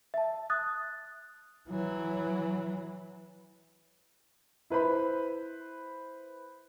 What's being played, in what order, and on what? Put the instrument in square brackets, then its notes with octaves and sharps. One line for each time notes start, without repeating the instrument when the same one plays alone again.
[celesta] E5 A5
D#6 F#6 A6
[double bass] E3 F#3
[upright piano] E4 B4 C5 B5